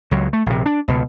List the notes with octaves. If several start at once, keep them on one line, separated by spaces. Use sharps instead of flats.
C#2 F#3
A3
A#1 C3
D4
C#2 B2